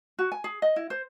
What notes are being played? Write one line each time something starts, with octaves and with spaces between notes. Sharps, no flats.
F#4
G#5
G#4
D#5
E4
C5